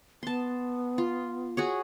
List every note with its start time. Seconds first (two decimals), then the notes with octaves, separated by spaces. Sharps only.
0.23 B3 A5 C6
0.98 F4
1.57 F#4 G#4 C#5